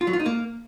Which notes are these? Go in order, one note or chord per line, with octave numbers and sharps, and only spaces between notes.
F4
F#3
F4
D#4
A#3